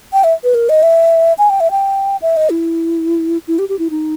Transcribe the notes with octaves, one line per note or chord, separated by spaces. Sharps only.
G5
E5
B4
A#4
D#5
E5
G#5
G5
E5
G5
E5
D#5
E4
E4
G4
G4
E4
D#4